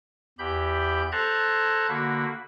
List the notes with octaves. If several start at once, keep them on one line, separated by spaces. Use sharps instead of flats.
E2 G4 B5 G6
A4 C5 A5 A#5 F#6 G#6
D3 A#3 F#4 B5